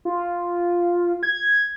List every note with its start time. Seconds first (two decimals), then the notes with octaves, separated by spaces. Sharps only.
0.05 F4
1.23 G#6